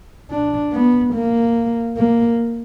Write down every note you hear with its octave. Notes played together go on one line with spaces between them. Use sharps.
D4
B3
A#3
A#3